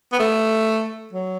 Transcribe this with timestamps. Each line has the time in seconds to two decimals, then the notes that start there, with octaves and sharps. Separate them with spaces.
0.13 B3
0.20 A3
1.13 F#3